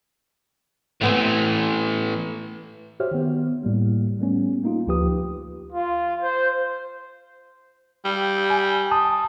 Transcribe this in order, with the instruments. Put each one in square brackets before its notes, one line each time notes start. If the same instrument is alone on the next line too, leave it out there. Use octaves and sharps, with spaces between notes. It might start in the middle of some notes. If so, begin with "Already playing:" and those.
[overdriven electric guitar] A2 E3 [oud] A3 B3 C4
[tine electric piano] F#4 G4 C5 C#5 E5 F6
D#3 B3
A2 G3 A#3
G3 A3 B3 C#4
A#3 D#4 F4
D2 F3 F4 G4 B4 D#6
[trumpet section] F4
C5
[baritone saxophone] G3
[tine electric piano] G#5
A5 D#6